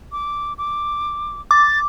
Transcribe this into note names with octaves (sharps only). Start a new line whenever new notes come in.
D6
D6
D6 A6